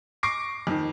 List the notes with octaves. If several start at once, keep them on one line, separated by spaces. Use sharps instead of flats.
C#6 D6 A#6 C7 D7
F2 D#3